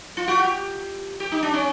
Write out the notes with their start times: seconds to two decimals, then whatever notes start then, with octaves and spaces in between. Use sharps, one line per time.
0.17 F4
0.28 F#4
0.39 G4
1.20 G4
1.32 D#4
1.43 D4
1.54 C#4